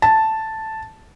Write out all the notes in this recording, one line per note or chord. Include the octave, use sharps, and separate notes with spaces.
A5